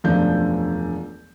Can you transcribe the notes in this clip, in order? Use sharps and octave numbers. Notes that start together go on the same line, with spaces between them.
E1 F#2 F3 A3 D4 G6